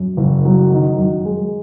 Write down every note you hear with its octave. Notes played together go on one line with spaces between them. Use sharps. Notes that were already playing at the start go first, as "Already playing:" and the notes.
Already playing: F#2
F#1
F#3
D#3
F#2
G#3